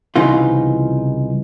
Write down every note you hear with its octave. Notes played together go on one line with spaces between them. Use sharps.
C2 C#3 E3 D#4 F4